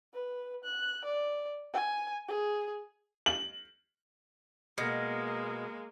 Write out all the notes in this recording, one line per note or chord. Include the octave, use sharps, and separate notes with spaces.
B4
F#6
D5
G#5
G#4
F#7
B2 G#3 A#3 F6 G#6 A#6